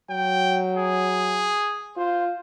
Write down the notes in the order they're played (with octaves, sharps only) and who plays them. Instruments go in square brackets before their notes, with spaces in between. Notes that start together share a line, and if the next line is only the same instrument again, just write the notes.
[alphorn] F#3 [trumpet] G5
[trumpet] G#4
[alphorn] F4 [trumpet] C5